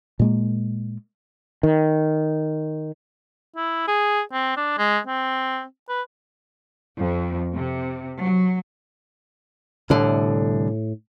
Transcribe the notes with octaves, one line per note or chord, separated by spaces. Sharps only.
A#2 G#3 A#3
D#3
E4
G#4
C4
D4
G#3
C4
B4
F2
C3
F#3
C2 A2 D3